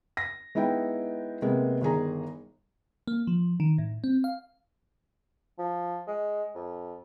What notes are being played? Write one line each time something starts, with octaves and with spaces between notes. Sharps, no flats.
A#6
G#3 B3 D#4 E4 G5
C3 G#3 A#3 B3
G1 D#3 G#4 A#5
A#3
F3
D#3
A2
C4
F5
F3
G#3
F2